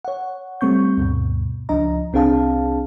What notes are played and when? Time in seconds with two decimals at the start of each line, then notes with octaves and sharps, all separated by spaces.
0.05 C#5 F#5
0.61 G3 A3 C4 C#6 G6
0.97 D2 G2 B2
1.69 C#2 F3 D4 D#5 A#5
2.13 C2 C4 D4 G#4 F5 A5